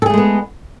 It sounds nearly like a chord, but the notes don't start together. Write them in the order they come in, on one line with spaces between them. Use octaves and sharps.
A4 G#4 A3 G#3 B3